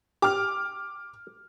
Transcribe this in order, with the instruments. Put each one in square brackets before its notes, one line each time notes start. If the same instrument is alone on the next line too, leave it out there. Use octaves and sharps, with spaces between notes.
[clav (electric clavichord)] G4 [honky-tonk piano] D6 F6